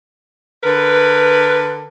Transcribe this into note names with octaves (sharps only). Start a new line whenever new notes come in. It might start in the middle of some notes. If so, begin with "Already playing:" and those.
D3 A#4 B4